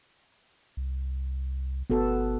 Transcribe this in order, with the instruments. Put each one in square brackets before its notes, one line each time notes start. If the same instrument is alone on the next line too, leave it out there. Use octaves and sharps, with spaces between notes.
[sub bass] C2
[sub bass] G1 [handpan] B3 F#4 A4